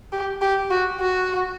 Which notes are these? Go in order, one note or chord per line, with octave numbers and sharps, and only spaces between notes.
G4
G4
F#4
F#4